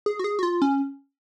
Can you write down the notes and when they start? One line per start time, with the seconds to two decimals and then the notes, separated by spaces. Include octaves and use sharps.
0.06 G#4
0.19 F#4
0.24 G#4
0.39 F#4
0.43 F4
0.62 C#4